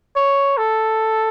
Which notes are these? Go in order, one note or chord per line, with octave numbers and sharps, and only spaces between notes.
C#5
A4